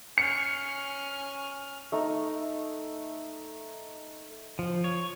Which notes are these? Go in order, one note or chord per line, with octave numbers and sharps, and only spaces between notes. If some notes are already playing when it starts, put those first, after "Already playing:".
C#4 F6 C#7
A3 D#4
F3
C#5